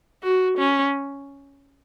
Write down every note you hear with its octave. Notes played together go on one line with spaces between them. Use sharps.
F#4
C#4